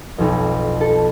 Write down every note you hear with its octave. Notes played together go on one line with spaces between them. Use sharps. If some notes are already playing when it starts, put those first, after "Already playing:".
B1 F2
A4